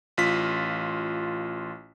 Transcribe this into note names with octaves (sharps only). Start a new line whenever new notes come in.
A1 F4 B6